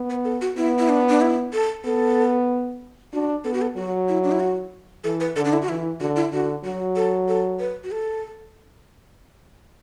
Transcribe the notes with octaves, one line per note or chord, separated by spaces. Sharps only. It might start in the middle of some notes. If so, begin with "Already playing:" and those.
Already playing: B3
B4
A4
F#4
B3 E4
E4
D4
D4
E4
A4
B3 A4
D4 F#4
B3 A4
F#4
A4
F#3 F#4
E4
D4
E4
F#4
E3 A4
B4
D3 A4
D4
E4
F#4
E3 E4
D3 F#4
E4
D3 F#4
F#3 F#4
A4
A4
B4
F#4
A4